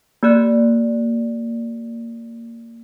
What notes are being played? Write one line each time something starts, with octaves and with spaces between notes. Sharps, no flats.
A#3 G4 D5 F#6